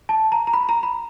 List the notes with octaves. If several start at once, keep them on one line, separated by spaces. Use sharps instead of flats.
A5
A#5
A#5
B5
A#5
B5